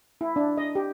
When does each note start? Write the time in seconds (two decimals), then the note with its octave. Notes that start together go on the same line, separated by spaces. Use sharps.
0.21 E4
0.36 D4
0.57 D#5
0.75 G4